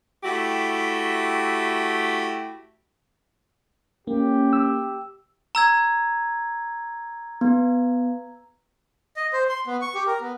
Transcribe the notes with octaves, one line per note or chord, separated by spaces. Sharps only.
A3 E4 F#4 G4
A#3 C#4 G4
E6
A#5 E6 G#6
B3
D#5
C5
C6
B3
C#6
G4
A#4
B3